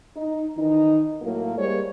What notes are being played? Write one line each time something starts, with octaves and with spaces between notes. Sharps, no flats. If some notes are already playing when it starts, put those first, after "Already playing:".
D#4
D#3 E3 D#4
A2 F#3 A#3
G3 G#3 A#3 C5 C#5